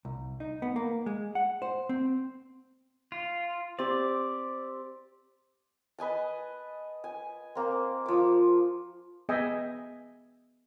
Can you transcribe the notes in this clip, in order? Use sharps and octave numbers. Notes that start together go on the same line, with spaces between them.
C2
D#4
B3
A#3
G#3
F#5
C5
C4
F4
C4 G4 D5
B4 D#5 G#5 A5
G#5
A#3 C4
F3 D6
B3 G#4 D#5 E5 G5 G#5